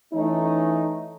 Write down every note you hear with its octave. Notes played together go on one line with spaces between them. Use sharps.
E3 A3 C#4 D#4